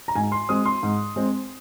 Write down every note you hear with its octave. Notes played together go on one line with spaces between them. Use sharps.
A#5
G#2 G#5
C6
G#3 C4 D#6
C6
G#2
G#3 C4